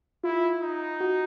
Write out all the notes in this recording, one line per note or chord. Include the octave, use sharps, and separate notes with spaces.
E4 F4
D#4
F#4